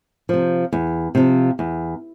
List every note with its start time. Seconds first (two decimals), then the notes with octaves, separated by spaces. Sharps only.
0.29 C3 F3
0.72 E2
1.15 C3 F3
1.59 E2